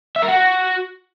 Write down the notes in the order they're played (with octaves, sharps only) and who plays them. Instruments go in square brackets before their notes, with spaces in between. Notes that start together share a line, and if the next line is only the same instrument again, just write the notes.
[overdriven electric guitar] E5
A#4
F#4